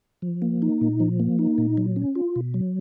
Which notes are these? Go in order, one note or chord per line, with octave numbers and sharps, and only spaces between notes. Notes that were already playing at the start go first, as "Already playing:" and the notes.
F3
A#3
D#4
A#2
F3
A#3
D#4
A#2
F#3
C#4
F4
B2
F#3